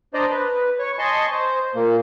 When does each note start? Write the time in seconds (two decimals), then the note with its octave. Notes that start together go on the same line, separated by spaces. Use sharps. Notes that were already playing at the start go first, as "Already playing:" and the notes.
0.14 D4 C5 D5 D#5 A#5
0.30 B4
0.79 C#5 C#6
0.99 D#5 G#5 A5 C6 C#6
1.32 C5
1.75 A#2 A#3